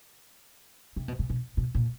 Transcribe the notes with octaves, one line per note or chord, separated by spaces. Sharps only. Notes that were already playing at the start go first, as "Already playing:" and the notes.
C3
B2
C3
B2
B2
A#2